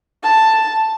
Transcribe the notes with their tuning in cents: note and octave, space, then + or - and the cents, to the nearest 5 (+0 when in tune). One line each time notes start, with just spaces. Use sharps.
A5 +5